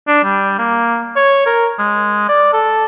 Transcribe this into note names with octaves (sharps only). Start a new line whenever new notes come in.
D4
G3
A#3
C#5
A#4
G#3
D5
A4